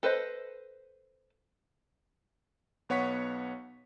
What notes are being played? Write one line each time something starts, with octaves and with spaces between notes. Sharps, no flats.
A4 B4 C5 D#5
B1 B3 C#5 F#5 C#6 B6